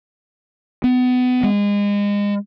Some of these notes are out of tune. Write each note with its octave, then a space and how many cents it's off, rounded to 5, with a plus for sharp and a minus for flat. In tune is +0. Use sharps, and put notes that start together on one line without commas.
B3 +25
G#3 -30